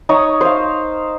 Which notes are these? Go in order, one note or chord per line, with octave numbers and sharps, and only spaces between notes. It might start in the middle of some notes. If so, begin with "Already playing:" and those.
D#4 C#5 D#6
C5 F5